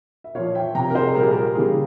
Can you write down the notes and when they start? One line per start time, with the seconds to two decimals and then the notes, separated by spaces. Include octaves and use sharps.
0.24 E5
0.35 A#2 F3 C#5 F5
0.55 E5 G5
0.75 C3 F3 G5 A#5
0.90 A#4
0.95 G#4 C5
1.15 A#2 G3 A#4
1.23 G#4
1.31 G4 A#4
1.55 C#3 E3 G3 G#4